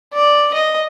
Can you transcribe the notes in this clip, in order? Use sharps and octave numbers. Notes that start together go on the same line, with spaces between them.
D5
D#5